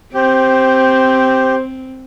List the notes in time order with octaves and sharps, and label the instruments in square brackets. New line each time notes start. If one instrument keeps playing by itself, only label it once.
[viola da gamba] C4 [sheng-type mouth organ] G4 [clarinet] C5